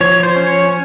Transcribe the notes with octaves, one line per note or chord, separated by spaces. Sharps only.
F3 C#5
C#5
C5
C#4
C#5
C#4